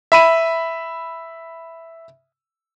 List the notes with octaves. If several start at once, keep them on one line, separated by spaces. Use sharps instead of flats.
E5 B5 D#7